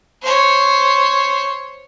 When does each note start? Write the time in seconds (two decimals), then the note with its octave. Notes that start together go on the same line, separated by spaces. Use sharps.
0.22 C5 C#5